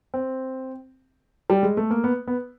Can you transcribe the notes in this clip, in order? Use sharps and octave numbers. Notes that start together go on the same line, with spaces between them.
C4
G3
G#3
A3
A#3
B3
B3